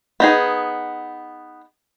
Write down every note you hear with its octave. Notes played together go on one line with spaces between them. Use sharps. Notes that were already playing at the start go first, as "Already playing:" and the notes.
B3 D#4 G#4